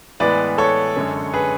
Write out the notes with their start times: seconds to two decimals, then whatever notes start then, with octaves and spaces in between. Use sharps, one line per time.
0.20 A2 E3 G#3 B3 B4 D5
0.58 A4 C#5
0.96 F#2 D3 G#3
1.34 G#4 B4